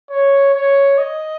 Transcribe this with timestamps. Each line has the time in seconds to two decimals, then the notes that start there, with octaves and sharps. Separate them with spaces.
0.10 C#5
0.54 C#5
0.98 D#5